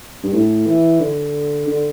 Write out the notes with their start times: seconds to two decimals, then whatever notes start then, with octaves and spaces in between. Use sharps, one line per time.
0.23 G2
0.33 A2
0.66 E3
1.00 D3
1.67 D3